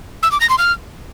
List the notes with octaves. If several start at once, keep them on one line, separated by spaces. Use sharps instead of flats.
E6
D6
A#6
C6
F6